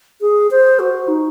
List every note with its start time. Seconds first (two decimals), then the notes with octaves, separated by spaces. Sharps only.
0.21 G#4
0.51 C5
0.79 F#4
1.08 D#4